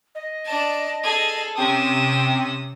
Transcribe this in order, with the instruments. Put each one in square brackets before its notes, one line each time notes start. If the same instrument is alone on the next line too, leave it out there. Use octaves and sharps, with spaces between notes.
[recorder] D#5
[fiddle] D4 A5
[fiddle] G#4 [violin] A4
[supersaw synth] C3 [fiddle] C#4 [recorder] G5 [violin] D#6 E7